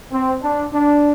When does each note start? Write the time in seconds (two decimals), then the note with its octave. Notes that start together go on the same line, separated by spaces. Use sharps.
0.12 C4
0.42 D4
0.73 D4